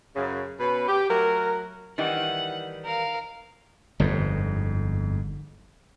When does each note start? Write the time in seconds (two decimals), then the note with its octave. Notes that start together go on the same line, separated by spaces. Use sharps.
0.16 F#2 C#3
0.60 B2 C#4 B4
0.88 G4
1.09 F#3 A3 A#4
1.98 D#3 E3 G3 F#5
2.85 A#4 F5
4.00 G1 F2 G#2